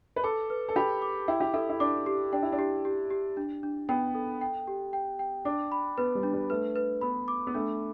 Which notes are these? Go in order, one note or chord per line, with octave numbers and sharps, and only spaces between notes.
B4
A4 D6
B4
A4
G4 B5
D6
E4 G5
G4
E4 A4
E4
D4 D6
G4
D4 G5
E4
D4
G4
G4
G4
D4
D4
B3 G5
A4
G5
G4
G5
G5
D4 D6
B5
B3 B4
G3
D4
G3
A3 B4
B4
B3 B5
D6
B3
A3 D4